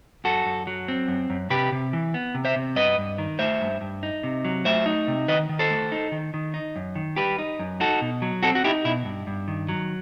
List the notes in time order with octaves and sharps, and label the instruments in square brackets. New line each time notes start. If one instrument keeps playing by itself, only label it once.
[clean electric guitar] F#2 F#4 A4
F#2
F#3
C4
F#2
F#2
C3 G4 B4
C3
E3
B3
C3
C5 E5
C3
G2 B4 D#5
G2
D#3
A3 C5 E5
G2
G2
D#4
C3
F#3
A3 C5 E5
D#4
C3
D#3 B4 D#5
D#3
A4 C5
A3
D#4
D#3
D#3
D#4
F#2
D#3
G3 G4 B4
D#4
F#2
D#4 F#4 A4
B2
F#3
C4 F#4 A4
F#4
D#4 E4 G4
B2 E4
G2
G2
D#3
F#3